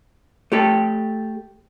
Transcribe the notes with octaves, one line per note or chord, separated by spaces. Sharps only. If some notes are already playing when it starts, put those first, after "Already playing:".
A3 G4 A4